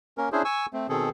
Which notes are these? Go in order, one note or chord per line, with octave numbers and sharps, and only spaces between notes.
A#3 C#4 A#4
C#4 D4 E4 G#4 C5
G#5 C#6 E6
A3 C4
B2 D#3 C4 G#4 A4